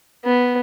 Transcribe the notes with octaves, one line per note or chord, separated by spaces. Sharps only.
B3